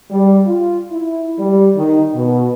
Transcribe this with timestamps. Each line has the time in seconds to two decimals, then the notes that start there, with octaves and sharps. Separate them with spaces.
0.11 G3
0.47 F4
0.92 E4
1.38 G3
1.76 D#3
2.16 B2